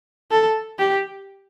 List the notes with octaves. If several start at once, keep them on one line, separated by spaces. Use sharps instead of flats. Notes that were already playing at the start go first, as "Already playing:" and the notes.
A4
G4